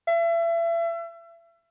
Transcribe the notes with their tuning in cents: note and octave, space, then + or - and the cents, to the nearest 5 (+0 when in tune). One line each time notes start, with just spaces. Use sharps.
E5 +35